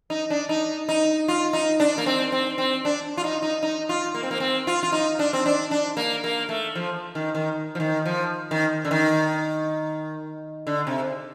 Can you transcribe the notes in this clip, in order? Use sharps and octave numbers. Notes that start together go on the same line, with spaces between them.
D#4
D4
D#4
D#4
F4
D#4
D4
A#3
C4
C4
C4
D4
F4
D#4
D#4
D#4
F4
A#3
C4
A#3
C4
F4
F4
D#4
D4
C4
D4
D4
A#3
A#3
A3
F3
D#3
D#3
F3
D#3
F3
D#3
D3
D#3
D3
C3